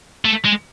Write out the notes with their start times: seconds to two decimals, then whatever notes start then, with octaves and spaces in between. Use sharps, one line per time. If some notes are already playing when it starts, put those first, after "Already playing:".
0.25 A3
0.45 G#3